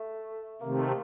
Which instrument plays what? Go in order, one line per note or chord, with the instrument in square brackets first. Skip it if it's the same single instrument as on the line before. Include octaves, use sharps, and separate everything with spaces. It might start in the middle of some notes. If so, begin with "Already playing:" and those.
Already playing: [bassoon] A3
[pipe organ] C3 D#3 A3 [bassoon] A#3